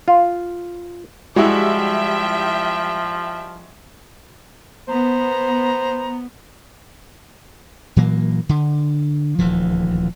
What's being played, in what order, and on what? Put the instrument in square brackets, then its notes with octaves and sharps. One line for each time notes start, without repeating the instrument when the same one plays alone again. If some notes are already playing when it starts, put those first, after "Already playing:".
[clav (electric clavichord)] F4
[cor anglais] F3 [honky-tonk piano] G3 E4 [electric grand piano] G#3 F#4 [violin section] E5 G5
[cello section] B3 [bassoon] C5 [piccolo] A#5
[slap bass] A#2 E3 F#3 A#3
D3
D#1 D2 E3 F3